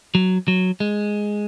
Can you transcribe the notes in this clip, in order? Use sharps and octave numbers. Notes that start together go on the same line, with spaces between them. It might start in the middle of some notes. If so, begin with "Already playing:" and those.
F#3
F#3
G#3